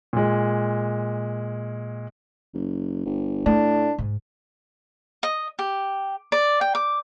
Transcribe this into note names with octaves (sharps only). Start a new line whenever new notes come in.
A#2 G#3
F#1
G1
A2 A3 D4
G#2
D#5
G4
D5
G5
D6